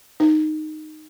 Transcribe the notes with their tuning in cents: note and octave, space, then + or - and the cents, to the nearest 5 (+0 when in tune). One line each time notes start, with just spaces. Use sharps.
D#4 -10